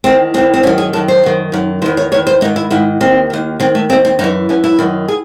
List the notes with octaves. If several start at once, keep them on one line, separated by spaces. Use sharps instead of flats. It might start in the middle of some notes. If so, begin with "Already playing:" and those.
E2 D#3 C4
E2 D#3 C4
C4
F#2 D#3 C#4
G#4
F#2 D#3 A4
C5
F#2 D#3
F#2 D#3
E2 D#3 C5
C#5
E2 D#3 C#5
C5
G#2 D#3 D#4
E4
G#2 D#3 E4
D#2 D#3 C4
D#2 D#3
D#2 D#3 C4
A3
D#2 D#3 C4
C4
F#2 E3 D#4
F#2 E3 C#4
E4
F#2 D#3
G#4